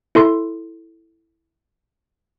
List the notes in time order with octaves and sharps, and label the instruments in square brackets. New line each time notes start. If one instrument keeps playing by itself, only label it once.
[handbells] E4 A4 C6